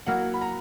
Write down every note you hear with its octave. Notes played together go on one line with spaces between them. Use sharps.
F#3 A#3 E4 A#4 F#5
B5
A#5